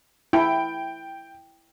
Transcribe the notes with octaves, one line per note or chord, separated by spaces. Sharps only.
E4 G5